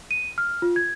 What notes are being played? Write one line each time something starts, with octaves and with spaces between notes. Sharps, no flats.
D#7
F6
F4
G#6